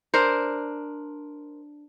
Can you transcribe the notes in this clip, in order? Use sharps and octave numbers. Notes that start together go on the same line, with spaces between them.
D4 A#4 C5